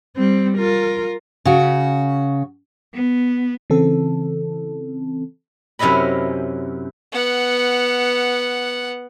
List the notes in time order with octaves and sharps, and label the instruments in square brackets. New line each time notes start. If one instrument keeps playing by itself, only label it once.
[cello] G3 C4
F4 A#4
[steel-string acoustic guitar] C#3 F#4
[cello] B3
[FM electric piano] C#3 E3 C4 A4
[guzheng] F#2 C3 C#4 E4 D#5 B5
[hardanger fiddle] B3 F#5